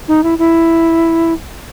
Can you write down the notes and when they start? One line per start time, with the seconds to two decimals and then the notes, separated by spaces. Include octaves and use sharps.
0.08 D#4
0.24 E4
0.39 E4